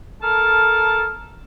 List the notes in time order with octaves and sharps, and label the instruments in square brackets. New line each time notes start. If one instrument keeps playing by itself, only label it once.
[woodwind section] A4 A#4 A5 F6